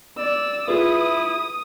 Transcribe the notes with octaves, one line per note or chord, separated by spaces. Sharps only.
D5 E6
E4 F4 G#4 B4 D#6